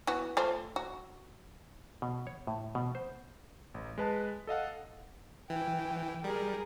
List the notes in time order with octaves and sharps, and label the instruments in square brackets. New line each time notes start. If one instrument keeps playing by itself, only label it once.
[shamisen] E3 B3 F#4
A3 F4 C5
F#4
[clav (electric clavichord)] B2
C#5
A2
B2
C5
[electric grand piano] A1
G#3 B4 A5
A4 D#5 F5 F#5
[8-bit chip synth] E3 [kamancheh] G5
[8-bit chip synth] G3 [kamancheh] G#4 A#4